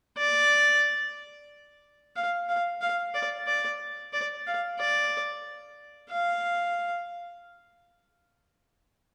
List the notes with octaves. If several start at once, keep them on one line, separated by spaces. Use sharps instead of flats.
D5
F5
F5
F5
D5
D5
D5
F5
D5
F5